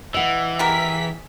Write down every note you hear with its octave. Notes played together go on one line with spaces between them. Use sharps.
E3 D#5 F#5
B3 G4 G#4 A#4 B6